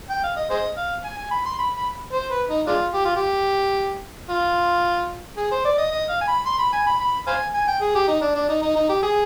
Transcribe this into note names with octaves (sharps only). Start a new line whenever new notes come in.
G5
F5
D#5
G#4 C5 D#5
F5
G#5
G#5
B5
C6
B5
B5
C5
B4
D#4
G#3 D4 F4
G4
F4
G4
F4
G#4
C5
D5
D#5
D#5
F5
G#5
B5
C6
B5
G#5
B5
B5
C5 F5 G#5
G#5
G5
G#4
G4
D#4
D4
D4
D#4
D#4
D#4
G4
G#4